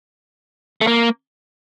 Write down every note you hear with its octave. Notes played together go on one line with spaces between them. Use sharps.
A3
A#3